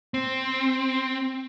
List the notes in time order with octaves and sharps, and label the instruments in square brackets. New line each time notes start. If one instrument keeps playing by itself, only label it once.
[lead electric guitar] C4